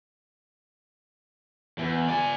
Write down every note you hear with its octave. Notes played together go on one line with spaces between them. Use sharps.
E2
D5 G#5